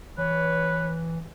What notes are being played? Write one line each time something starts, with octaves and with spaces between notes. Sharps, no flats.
E3 B4 C#5